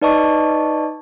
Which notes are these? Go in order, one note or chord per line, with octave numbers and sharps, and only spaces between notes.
D#4 B4 D5 D#5 A5 C#6